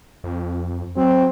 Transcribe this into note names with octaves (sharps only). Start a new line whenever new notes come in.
F2
F#3 C4